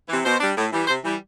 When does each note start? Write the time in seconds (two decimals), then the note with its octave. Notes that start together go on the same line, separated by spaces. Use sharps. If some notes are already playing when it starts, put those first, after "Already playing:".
0.09 C3 E3
0.25 B2 C5
0.40 G3 D4
0.57 A2
0.72 E3 G3
0.88 C3 C5
1.04 E3 G3